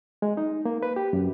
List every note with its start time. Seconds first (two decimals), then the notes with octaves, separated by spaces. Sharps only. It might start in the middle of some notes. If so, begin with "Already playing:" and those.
0.22 G#3
0.37 D#4
0.65 A#3
0.83 B4
0.96 G4
1.13 F#2